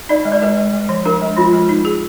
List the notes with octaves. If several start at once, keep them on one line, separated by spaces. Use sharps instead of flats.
D#4 D5
G#3
D5
G#3 B4
G#3
G#3
F3
D4 A#4
G#3
F3 F4
G#3
D#4
G#4